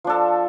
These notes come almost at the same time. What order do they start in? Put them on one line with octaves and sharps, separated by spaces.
F3 D4 A4